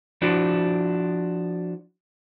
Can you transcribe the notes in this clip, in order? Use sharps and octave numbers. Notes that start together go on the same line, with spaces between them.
F3 D4 E4 F#4